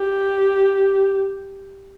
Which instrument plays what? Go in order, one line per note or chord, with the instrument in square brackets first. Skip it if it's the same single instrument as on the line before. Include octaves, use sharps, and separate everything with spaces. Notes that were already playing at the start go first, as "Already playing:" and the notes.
Already playing: [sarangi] G4